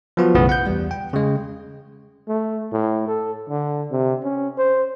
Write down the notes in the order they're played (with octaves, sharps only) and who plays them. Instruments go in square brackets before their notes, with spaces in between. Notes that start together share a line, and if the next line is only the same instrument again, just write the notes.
[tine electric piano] F3 F#3 B3 F4 F#4
B1 F#2 C#3 E3 A3 B3
F#5 G6
E2 G3
G5
C#3 G#3
[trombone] A3
A2
A4
D3
C3
C#4
C5